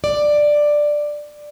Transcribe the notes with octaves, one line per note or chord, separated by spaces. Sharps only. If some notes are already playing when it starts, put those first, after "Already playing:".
D5